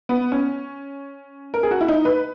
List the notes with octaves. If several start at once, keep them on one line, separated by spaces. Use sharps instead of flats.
B3
C#4
A#4
G#4
F#4
E4
D#4
B4